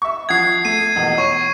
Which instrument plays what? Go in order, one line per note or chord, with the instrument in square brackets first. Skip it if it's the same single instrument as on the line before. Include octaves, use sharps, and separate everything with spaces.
[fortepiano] E5 C#6
[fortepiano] F3 F#5 D#6 [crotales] G#6 C7
[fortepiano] A3 [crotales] C7 D#7
[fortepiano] A#1 E2 B2
[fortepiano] C#5 [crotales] C#6